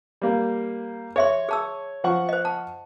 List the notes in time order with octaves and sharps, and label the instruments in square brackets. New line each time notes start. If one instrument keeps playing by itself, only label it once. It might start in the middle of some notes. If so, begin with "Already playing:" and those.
[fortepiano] G3 A#3
[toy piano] G#4 E5 C6 [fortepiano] C#5
[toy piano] G#4 A5 E6
[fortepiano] F3 F#5 C#6
[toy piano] C5 D#5
A5